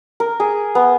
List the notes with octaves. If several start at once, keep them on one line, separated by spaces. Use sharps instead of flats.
A#4
G#4
B3